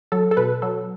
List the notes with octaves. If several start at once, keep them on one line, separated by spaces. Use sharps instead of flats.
F#3 A4
A4
B2 B4
F#3 A4